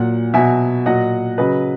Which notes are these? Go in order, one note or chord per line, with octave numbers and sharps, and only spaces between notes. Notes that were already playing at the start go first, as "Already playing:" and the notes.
Already playing: A#2 F#3 F#5
B2 F#3 E5 G#5
A#2 F#3 D#5 F#5
C#3 F#3 B4 D#5